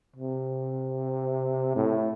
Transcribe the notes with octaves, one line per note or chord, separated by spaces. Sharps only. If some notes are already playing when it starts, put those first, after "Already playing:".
C3
A2